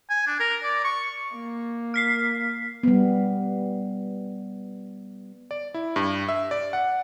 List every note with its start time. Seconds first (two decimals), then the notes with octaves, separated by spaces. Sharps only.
0.10 G#5
0.27 D4
0.40 A#4
0.64 D5
0.85 C#6
1.35 A#3
1.94 F6 B6 C7
2.83 G3 B3
5.51 D5
5.74 E4
5.96 G2
6.28 E5
6.51 D5
6.73 F#5